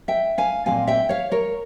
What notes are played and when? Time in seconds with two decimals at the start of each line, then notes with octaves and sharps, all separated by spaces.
0.08 E5 G5
0.38 F5 G#5
0.66 F3 C4 F5 G#5
0.71 A#2
0.87 E5 G5
1.09 C#5 F5
1.32 A#4 C#5